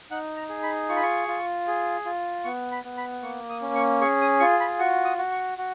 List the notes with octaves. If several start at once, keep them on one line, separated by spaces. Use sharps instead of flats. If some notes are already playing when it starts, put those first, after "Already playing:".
D#4 F#5
A#5
G#4
B5
F4 C#6
B5
C#6
F4
G#4
F4
B3 C#6
B5
B3
B5
A#3 C#6
D#6
C#4
C#6
G#4 C#6
D#6
F4 C#6
B5
F#4 C#6
D#6
F#4
C#6
F#4